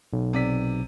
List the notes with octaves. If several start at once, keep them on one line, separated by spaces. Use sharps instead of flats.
B1
C3 D5 B6